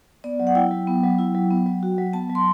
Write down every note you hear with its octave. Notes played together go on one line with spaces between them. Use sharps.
B3 D5
F#3
F#5
E4 G5
F#3
B3
F#3
E4
F#3
B3
F#3
F#4
F#3
B3 A5
F#3
C6